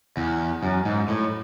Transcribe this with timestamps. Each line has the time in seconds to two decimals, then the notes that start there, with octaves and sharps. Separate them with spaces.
0.17 E2
0.63 F#2
0.85 G#2
1.08 A2